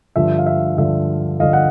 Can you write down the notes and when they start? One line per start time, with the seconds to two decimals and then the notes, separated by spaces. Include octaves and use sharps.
0.16 G2 D3 F3 E5
0.39 F5
0.46 E5
0.78 G2 D3 F3 E5
1.40 G2 D3 F3 D#5 F5
1.53 F#5